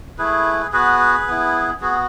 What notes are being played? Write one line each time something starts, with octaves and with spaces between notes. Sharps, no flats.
A3 E4 G#4 B4
B3 F#4 G#4 B4
B3 E4
B3 F#4 G#4